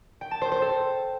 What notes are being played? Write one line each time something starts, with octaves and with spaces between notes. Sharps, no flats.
G5
A5
C5
C5
A4